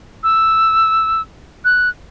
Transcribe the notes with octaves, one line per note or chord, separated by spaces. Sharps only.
E6
F#6